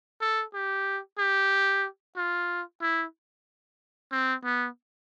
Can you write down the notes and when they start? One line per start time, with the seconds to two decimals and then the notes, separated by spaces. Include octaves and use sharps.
0.21 A4
0.54 G4
1.18 G4
2.16 F4
2.82 E4
4.12 C4
4.45 B3